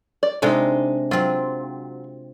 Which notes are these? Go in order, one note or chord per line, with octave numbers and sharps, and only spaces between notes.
D5
C3 G#3 D4 D#4 A4
F#3 C4 F4